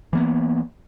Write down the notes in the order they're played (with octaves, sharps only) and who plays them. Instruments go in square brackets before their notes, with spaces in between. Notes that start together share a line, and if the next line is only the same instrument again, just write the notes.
[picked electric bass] E3 A#3 B3